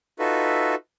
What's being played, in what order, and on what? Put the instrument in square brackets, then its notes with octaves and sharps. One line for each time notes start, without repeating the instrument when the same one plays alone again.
[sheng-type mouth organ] D#4 F4 F#4 A4 B4 E5